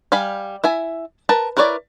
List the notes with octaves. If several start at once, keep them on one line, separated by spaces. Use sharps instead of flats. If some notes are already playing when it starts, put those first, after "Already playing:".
G3 F5 G#5 B5
E4 E5 G#5
A#4 B4 A5
E4 A#4 B4 C#5 D5